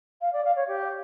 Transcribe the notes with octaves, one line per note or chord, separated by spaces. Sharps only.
F5
D5
F5
C#5
G4